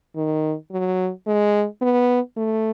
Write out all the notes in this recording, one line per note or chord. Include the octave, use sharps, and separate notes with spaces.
D#3
F#3
G#3
B3
A3